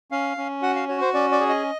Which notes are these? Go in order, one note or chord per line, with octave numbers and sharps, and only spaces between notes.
C#4 F5
C#4
F#4 F#5
F5
F#4 C#5
C5
C#4 D5
D5
G#4
D#5